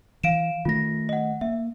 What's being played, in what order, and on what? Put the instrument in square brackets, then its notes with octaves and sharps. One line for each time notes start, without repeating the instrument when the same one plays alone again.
[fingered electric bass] E3 [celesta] F5 D7 E7
[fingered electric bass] D#3 A3 [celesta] F4 A#6
[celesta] D#5 F#5
[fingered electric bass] A#3 [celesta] E5